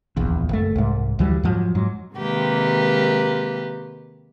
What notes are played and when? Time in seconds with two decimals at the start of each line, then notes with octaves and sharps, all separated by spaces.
0.17 D1 A#1 E2
0.49 F#1 A3
0.76 C2 G#2
1.19 D2 E3 F#3 G3
1.43 F2 G#2 F3 F#3
1.75 G#2 F#3
2.14 C3 D#3 G#3 A#3 G4 B4